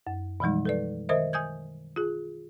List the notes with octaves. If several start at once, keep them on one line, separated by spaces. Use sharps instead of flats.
F#2
B2 E3 F3 G3 G#3 D#4
A4 B4 D5
D#3 A#4 C5 D#5 E5
G#5 D#6 G6 G#6
F4 G#4